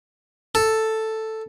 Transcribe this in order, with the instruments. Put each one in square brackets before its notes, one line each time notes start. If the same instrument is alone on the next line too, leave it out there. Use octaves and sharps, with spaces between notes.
[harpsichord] A4